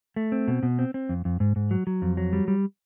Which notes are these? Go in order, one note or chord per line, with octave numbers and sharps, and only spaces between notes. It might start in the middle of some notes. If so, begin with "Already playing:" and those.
A3
C4
B2
B2
C4
C4
F2
F2
G#2
G#2
F#3
F#3
F2
F#3
G3
G3